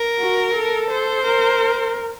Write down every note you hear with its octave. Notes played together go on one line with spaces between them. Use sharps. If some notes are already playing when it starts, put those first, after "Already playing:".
Already playing: A#4
F#4
A4
C5
A#4